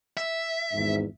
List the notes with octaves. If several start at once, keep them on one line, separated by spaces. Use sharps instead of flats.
E5
G#1 E2 G#2